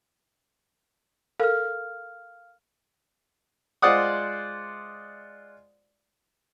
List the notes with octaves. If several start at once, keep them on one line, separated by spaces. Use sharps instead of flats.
A4 A#4 F5 F6
G#3 F4 C5 D5 F#5 D#6